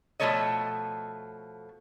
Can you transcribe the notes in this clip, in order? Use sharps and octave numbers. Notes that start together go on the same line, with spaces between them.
B2 F3 A3 A4 C#5 D#5